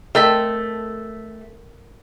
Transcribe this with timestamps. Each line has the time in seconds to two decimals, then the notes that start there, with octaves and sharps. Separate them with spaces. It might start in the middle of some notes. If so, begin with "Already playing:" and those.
0.15 A3 C4 A#4 D#5 G5 E6 B6